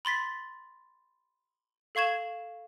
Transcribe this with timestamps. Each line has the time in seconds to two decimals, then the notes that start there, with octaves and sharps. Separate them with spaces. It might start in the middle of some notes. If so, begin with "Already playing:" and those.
0.05 B5 C6 A6 B6
1.95 A4 F5 C#6 G#6 E7